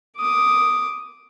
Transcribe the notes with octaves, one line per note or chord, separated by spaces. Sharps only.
D6 D#6